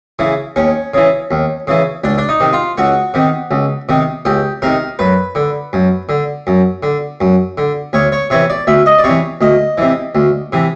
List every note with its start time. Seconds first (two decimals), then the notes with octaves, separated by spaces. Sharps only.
0.19 C#3 E3
0.56 D#2 C#4
0.94 C#3 E3
1.31 D#2
1.67 C#3 E3
2.04 C#2 D4
2.18 D4
2.29 D#4
2.40 C3 D#3
2.53 F4
2.78 C#2 F#4
3.14 C3 D#3
3.51 C#2
3.89 C3 D#3
4.25 C#2 G4
4.62 C3 D#3 A#4
4.99 F#2 B4
5.35 D3
5.73 F#2
6.09 D3
6.47 F#2
6.83 D3
7.21 F#2
7.58 D3
7.93 D2 C#5
8.12 C#5
8.30 C3 E3 C#5
8.50 D5
8.67 D2 E5
8.86 D#5
8.99 D5
9.04 C3 E3 C#5
9.41 D2 D#5
9.78 C3 E3
10.15 D2
10.52 C3 E3